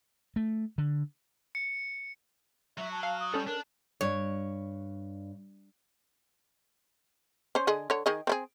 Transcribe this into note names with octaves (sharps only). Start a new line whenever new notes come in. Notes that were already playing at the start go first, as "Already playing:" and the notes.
A3
D3
C#7
F#3 F#4 E5
A5
F5 A5
D#6
G3 C#4 A4
D4 A#4
G2 C#5
C#4 C5
D3 G#4 D#5
D3 C#5
D#3 G#4 D#5
C4 E4 G#4